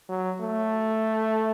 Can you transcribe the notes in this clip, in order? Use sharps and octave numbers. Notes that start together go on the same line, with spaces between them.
F#3
A3